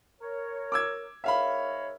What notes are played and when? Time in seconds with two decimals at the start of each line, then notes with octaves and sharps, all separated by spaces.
0.21 A#4 C#5
0.72 D6 E6 G#6
1.24 G#2 A#4 C#5 E5 F5 B5